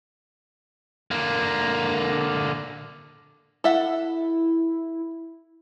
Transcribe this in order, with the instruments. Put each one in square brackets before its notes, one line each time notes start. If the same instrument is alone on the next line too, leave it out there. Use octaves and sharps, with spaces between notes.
[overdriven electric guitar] D3 A#3
[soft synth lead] E4 [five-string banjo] A4 E5 F#5